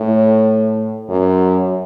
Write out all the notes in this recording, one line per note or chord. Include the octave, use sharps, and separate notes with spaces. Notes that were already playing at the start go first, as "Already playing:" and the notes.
Already playing: A2
F#2